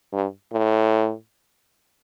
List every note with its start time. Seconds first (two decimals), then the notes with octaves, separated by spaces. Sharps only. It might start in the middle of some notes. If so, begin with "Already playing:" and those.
0.13 G2
0.53 A2